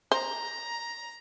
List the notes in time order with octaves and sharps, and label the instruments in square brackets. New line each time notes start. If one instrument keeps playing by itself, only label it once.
[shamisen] C5 [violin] A#5